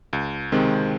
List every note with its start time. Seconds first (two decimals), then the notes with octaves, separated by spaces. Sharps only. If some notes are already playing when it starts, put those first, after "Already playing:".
0.13 C#2
0.52 C3 D#3 G#3 C4